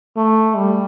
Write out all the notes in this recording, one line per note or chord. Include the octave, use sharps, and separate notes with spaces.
A3
G3